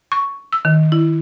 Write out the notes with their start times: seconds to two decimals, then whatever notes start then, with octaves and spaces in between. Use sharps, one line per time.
0.12 C#6
0.53 E6
0.65 D#3
0.92 E4